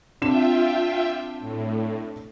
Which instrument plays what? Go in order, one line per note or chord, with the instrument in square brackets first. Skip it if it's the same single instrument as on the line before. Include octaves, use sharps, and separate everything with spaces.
[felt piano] C4 D4 E7 [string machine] F4 E5 G5
[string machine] A2